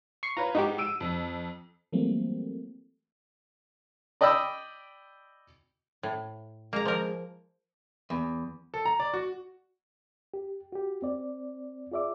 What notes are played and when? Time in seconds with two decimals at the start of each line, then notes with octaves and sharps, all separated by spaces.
0.23 C#6 C7 C#7
0.37 F4 B4 C#5 A#5
0.55 G#2 D#4 F#4 G4
0.78 E6 D7 D#7
1.00 F2
1.93 E3 F#3 G3 A3 A#3 C4
4.21 D5 D#5 G5 B5 E6
6.03 A2
6.73 G#3 A#3 A#5
6.85 F3 A#4
8.10 E2
8.74 A4
8.85 A#5
9.00 D5
9.14 F#4
10.34 G4
10.72 F#4 G4
11.02 C4 D5
11.91 F4 G#4 D5 E5 D6